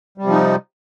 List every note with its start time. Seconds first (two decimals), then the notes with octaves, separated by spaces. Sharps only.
0.18 G3
0.22 C3
0.27 F3
0.32 D#4